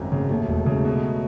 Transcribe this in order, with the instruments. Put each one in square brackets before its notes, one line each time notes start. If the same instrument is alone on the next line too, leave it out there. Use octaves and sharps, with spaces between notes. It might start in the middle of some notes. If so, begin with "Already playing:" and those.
Already playing: [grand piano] G#1 F#2 A3
C#3
[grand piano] D#2 [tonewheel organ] F#3 A3
[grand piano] E1
C#3
B2